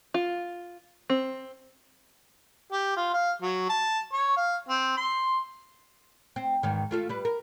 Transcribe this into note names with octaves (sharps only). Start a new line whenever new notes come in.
F4
C4
G4
F4
F5
F#3
A5
C#5
F5
C4
C6
C4
E2 G#2 D#3
A3 F4 A4
G3 B4
A#4